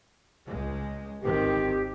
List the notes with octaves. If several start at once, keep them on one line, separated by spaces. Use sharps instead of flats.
C#2 G#3
G#1 D#3 C4 G4